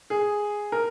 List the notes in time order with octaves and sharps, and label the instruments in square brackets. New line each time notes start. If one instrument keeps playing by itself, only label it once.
[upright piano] G#4
A#4